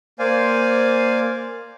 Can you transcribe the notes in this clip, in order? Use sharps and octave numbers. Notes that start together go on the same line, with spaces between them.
A#3 C5 D5 F5 G#5